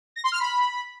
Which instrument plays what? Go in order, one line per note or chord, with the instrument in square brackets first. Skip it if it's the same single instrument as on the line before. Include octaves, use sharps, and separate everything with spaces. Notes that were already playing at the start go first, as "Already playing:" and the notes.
[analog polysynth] A#6
C6
F6
B5